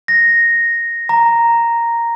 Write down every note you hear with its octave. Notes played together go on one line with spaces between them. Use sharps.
A#6
A#5